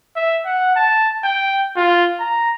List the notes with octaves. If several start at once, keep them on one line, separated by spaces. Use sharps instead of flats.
E5
F#5
A5
G5
F4
A#5